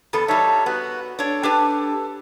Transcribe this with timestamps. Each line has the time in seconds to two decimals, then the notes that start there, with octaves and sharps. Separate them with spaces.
0.13 E2 B3 A4
0.28 G3 D4 D#4 C#5 E5
0.66 B3 F#4 F#5
1.19 D4 A4 C#5
1.43 D4 G4 B4